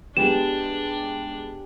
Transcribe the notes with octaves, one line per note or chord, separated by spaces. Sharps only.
G#3 B3 D4 G4 G#5 E7